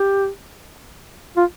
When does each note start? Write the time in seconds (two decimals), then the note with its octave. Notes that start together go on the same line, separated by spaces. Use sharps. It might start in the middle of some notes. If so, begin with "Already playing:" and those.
Already playing: G4
1.36 F4